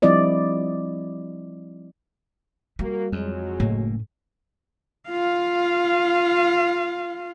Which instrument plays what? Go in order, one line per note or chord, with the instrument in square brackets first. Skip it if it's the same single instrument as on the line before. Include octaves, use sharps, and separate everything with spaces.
[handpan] F3 G3 C4 E4 D5 D#5
[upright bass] G3 [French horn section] A#3 F#4
[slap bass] F2 [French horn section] F#3 G#3
[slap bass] F#1 A3 A#3 [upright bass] A2 C#4
[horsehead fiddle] F4 F5